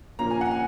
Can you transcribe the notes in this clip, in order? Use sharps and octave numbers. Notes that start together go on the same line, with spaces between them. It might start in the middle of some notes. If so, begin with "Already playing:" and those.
A#2 F3 A#3 C#4 A#5
G#5
F#5
G#5